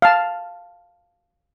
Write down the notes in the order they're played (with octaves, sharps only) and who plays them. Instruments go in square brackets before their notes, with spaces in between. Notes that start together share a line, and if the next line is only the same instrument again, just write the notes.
[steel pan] F5 A5